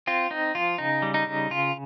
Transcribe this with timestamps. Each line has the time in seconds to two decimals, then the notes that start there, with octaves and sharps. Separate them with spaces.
0.07 C4 F4
0.30 C4 D#4
0.55 F3 F4
0.78 C#3 D#4
1.02 G3
1.14 D#4
1.27 C#3
1.50 C#3 F4